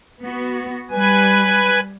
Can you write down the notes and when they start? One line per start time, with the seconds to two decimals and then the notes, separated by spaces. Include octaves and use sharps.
0.24 B3 F#4
0.91 G3 B4 G#5